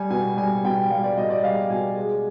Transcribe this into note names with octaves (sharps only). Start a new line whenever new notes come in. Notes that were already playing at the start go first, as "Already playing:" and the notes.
Already playing: G3 G#5
B2 G#5
G3 G#5
B2 G5
G3 F5
D5
B2 D#5
D5
G3 F5
B2 G#5
G#3